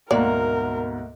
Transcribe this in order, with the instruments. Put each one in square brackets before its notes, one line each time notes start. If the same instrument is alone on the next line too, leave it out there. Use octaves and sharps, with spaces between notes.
[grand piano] D2 G#2 B2 [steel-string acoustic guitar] A3 A#3 F#5 [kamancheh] A#4 [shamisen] D5